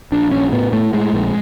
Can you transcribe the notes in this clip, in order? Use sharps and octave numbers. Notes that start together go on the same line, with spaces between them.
A#1 D4
A#1 C#4
A2 B3
A2 A3
A2 G#3
A#1